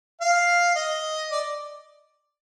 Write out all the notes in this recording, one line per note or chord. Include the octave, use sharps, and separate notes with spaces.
F5
D#5
D5